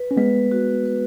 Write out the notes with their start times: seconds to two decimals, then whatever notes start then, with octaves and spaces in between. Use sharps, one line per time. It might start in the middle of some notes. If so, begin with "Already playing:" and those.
Already playing: B4
0.11 C#4
0.16 G#3 B3 B4
0.51 F#4
0.85 B4